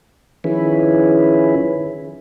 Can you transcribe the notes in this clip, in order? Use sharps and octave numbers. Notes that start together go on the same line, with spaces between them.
D#3 F3 C#4 E4 G#4 B4